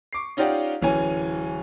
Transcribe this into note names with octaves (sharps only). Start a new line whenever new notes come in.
C#6 D6 C7
C#4 D#4 F4 G4 D5 F#5
D1 E3 C#4 G#5